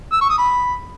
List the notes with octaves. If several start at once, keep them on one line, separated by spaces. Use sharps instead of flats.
E6
C#6
D#6
B5